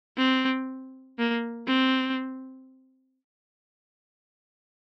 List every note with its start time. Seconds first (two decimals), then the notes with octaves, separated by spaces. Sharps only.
0.18 C4
1.18 A#3
1.68 C4